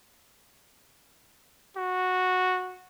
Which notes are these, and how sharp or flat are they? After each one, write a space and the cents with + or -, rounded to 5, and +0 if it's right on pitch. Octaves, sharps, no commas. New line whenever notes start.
F#4 -10